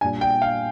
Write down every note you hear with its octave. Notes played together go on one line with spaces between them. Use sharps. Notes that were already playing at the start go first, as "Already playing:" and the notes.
A#2 G3 D4 G#5
G5
F5